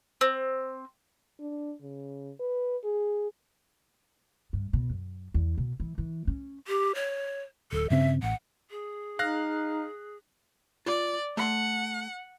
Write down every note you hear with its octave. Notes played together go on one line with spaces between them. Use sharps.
C4
D4
C#3
B4
G#4
G2
B2
F#2
E2
B2
E3
E3
C#4
G4
C#5
D1 A4
G2 C#3 C4 E5
A1 F#5
G#4
D#4 F5 F#6 A#6
F4 D5
A3 F#5 B5 C6